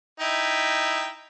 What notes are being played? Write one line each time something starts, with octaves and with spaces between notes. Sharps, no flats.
D#4 E4 G5